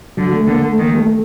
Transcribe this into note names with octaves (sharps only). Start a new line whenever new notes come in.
D3 F#3
A3
D3 A#3
A3
D#3 A#3
G3
A3